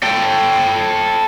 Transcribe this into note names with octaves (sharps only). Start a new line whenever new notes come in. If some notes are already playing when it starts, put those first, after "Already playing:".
A4 G5